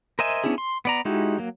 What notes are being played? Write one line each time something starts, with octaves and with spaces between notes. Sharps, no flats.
A#4 C5 D#5 E5 G#5
B3 C#4 D4 E4 G#4
C6
B3 D5 A#5
G#3 D#4 E4 F#4 G4
F#3 A#3